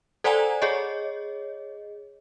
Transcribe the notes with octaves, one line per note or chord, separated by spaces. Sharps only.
A4 C5 D5 F#5 G#5 A#5
G#4 C#5 D#5